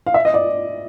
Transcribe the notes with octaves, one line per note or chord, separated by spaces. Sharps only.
F5
E5
D#5
D5